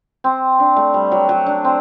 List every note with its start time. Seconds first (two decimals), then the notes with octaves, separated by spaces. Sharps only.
0.24 C4
0.60 D4
0.76 A3
0.94 G3
1.12 F#3
1.29 F#3
1.46 D4
1.64 C4